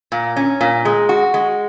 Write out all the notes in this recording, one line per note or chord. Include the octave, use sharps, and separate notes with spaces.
A#2
C#4
A#2
G#3
F#4
G#3